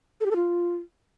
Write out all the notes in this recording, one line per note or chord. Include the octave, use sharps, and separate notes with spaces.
A4
G4
A4
F4